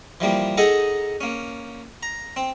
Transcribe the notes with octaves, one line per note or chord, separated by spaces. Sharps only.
E3 F3 G3 A#3
D#4 G#4 A4 D#5 F#5 A#5
A#3 C#4
A#5
C4